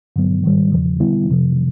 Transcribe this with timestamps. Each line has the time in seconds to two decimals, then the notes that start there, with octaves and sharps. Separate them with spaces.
0.16 G2 D3 F#3 B3
0.44 G#2 D#3 G3
0.72 E2 C#3 F3
1.00 D3 G3 B3 E4
1.29 F2 C3 F3